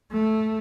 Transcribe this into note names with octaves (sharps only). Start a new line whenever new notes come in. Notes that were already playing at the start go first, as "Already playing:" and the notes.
A3